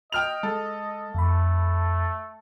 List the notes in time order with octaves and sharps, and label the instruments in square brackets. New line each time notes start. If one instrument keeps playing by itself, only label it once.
[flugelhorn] D#5 [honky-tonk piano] G5 F6 F7
[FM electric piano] G#3 [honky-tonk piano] A4
[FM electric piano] F2 B5 [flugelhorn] A3